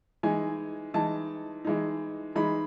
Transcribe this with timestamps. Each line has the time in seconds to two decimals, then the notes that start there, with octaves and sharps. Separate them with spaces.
0.23 E3 G#3 D#4 G#5
0.94 E3 G#3 D#4 A5
1.65 E3 G#3 D#4
2.36 E3 G#3 D#4 B5